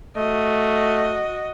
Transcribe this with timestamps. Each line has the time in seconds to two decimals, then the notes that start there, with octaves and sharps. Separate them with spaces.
0.17 A3 F#4 D#5